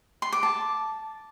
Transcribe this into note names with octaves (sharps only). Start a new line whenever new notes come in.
C6
D6
A5